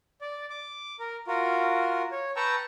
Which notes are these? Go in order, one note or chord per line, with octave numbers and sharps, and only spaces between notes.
D5
D6
A#4
F4 F#4 A#4
C#5
B4 G5 A5 A#5 C#6 E6